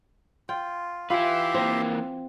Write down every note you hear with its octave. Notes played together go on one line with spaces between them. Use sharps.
F4 G5
E4 F4 G4 B4 E5 C6
E3 A#3 C4